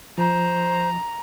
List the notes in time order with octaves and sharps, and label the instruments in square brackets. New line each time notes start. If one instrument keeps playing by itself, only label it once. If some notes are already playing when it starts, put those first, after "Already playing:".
[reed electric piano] F3 [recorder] C5 [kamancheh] A#5